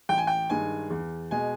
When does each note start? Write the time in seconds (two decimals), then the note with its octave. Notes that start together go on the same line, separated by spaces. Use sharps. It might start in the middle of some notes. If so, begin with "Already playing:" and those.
0.09 A1 G5
0.18 G#5
0.27 G5
0.50 G2 D#3 G#3 G#5
0.90 E2
1.31 B2 G#3 G#5